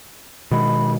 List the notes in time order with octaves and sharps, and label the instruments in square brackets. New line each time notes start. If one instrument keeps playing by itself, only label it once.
[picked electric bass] B2 D#3 G#3 [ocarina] B5